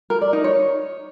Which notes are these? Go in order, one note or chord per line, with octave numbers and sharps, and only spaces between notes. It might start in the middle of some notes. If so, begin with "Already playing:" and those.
A#4
D5
D#4
C#5